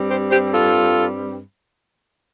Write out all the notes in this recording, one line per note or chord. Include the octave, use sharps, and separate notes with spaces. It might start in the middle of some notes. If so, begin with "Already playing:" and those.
Already playing: G2 G3 C4
G4 C5
G4 C5
F4 A4